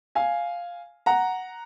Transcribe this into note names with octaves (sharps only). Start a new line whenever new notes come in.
F5 G#5
F#5 A#5